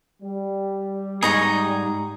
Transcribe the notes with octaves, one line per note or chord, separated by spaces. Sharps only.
G3
G#2 D#4 G#4 A#5 C#6